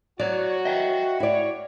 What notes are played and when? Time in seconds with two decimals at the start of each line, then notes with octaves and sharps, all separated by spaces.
0.20 F#3 F#4 C#5 D5
0.65 D#5 E5 G5
1.20 C#4 E4 F#4 C#5 D5